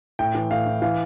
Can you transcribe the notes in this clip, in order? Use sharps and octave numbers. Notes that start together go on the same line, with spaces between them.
A2 G5
E3
A2 F5
E3
E3 F5